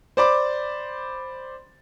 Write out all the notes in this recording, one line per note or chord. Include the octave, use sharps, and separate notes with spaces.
C5 D5 B5 D6